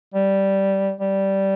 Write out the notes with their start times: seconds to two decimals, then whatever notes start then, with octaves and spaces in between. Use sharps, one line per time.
0.14 G3
1.00 G3